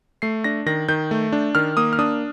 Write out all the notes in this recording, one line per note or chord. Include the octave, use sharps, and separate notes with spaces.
A3 C7
D4 A#6
D#3 A#6
D#3 G6
A3
D4
D#3 F6
A#3 D#6
F6
D4 D#6